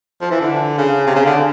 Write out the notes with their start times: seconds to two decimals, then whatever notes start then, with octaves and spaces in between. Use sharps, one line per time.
0.21 F3
0.31 E3
0.41 D3
0.78 C#3
1.07 C3
1.15 C#3
1.26 D3